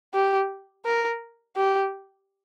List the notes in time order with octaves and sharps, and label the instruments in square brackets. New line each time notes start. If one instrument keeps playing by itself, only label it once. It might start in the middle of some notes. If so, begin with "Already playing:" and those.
[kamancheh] G4
A#4
G4